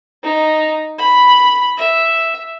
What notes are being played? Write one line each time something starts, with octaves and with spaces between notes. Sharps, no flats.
D#4
B5
E5